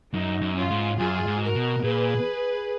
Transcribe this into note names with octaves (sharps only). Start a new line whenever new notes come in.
F#2 D#4
F#2
C#4 F4
G#2
F#2 F4 G#4
G#2
F#4 A#4
B2
A#2 G#4 B4